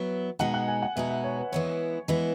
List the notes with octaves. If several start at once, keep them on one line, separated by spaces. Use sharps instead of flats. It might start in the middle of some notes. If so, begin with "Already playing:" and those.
Already playing: F#3 B3 E4
B2 G#3 D#4 F#5
F#5
G#5
F#5
B2 G#3 D#4 E5
E5
C#5
B4
E3 G#3 B3 E4 C#5
E3 G#3 B3 E4